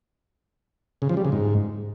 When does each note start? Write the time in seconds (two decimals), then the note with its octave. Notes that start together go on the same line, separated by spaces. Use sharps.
1.02 C#3
1.09 F3
1.17 G3
1.25 C#3
1.32 G#2